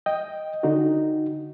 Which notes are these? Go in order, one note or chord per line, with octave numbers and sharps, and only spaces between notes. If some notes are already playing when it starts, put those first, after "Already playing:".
D#5 G5
D3 D#4 F#4